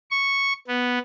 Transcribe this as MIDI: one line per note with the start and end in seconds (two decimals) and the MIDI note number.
0.11 0.53 85
0.68 0.99 59